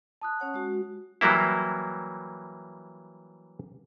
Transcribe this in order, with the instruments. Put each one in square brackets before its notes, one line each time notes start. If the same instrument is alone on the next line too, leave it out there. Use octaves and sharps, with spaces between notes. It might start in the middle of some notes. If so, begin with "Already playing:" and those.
[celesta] A5 D#6 F#6
[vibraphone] C#4 C#5 F#5
G#3 F#4
[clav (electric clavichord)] E3 F#3 G3 A#3 E4